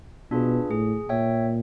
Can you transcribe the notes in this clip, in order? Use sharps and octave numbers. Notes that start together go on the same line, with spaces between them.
B2 D4 F4 G#4 B4
A2 G#4
A#2 C#5 E5 G5